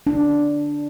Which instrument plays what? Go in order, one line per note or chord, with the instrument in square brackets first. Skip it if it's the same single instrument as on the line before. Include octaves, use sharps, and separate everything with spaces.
[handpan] D4